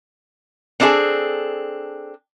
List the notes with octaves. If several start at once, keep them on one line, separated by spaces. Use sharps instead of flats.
C4 D4 D#4 F4 G#4 A4